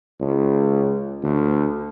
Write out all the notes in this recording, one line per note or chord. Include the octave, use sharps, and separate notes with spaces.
C#2
D2